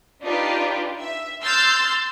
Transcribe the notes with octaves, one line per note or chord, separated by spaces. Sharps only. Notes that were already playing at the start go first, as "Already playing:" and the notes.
D4 D#4 F4 G4 B4
E5
C6 E6 F6 G6 A6